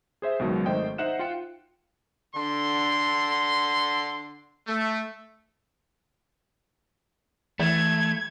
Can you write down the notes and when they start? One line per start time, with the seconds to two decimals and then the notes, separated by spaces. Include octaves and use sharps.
0.22 G#4 C5 E5
0.39 C#2 B2 D#3 F#3
0.66 G#1 D#3 A3 C5 D#5 G5
0.98 D#4 C5 E5 F#5 F#6 E7
1.19 F4 F5 G5 C#7
2.35 D3 C6
4.66 A3
7.59 E3 A3 G#6